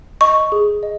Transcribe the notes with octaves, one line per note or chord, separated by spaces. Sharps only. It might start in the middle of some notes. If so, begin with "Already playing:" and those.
D#5 C#6
G#4
D#5